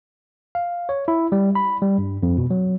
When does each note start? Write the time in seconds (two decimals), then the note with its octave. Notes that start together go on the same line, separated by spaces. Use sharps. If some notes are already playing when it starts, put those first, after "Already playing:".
0.55 F5
0.89 C#5
1.08 E4
1.32 G3
1.55 B5
1.82 G3
1.98 G2
2.23 F2
2.38 B2
2.50 F#3